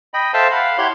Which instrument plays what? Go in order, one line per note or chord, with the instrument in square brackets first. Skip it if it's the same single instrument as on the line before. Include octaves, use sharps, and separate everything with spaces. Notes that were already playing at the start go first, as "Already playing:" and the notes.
[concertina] D#5 G5 B5
A4 C5 E5 F5 G5 A5
F5 F#5 B5
E4 G4 C#5 F#5 B5 C6